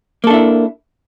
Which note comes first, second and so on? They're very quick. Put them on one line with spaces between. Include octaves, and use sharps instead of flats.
A#3 A4 D4 E4